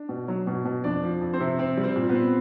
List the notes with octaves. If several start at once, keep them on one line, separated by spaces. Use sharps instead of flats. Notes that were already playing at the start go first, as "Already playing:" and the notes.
Already playing: D4
B2
F#3
B2
B2
F2 D4 D5
F3
F2
C4 C5
C3
C4 C5
G3
C4 C5
A#2
B3 B4
C4